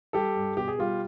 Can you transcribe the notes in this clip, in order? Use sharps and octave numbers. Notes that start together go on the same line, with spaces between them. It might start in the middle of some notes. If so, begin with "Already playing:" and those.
G3 G4 A4
G2
B2 G4
G#4
G3 F4 G4